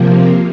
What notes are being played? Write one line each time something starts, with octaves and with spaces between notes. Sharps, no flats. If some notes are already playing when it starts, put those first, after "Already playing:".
Already playing: C3 F3 A#3